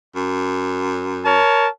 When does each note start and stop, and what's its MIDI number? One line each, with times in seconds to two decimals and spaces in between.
0.15 1.39 42
1.25 1.68 70
1.25 1.68 73
1.25 1.68 81